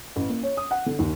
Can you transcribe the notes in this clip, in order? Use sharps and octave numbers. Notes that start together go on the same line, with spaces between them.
A1
A#3
C#5
D#6
F#5
D3
D#2